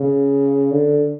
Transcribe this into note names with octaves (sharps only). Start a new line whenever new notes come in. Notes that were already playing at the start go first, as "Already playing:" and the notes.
Already playing: C#3
D3